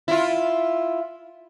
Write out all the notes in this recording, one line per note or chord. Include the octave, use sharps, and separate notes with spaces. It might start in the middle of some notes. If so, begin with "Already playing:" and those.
E4 F4